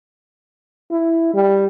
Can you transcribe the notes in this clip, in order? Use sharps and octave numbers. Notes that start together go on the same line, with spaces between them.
E4
G3